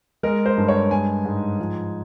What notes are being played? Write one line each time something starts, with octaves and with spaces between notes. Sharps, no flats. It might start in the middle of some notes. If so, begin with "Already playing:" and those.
G#3 A#4
C5
G2
C#5
G#3 G#5
G#2
F3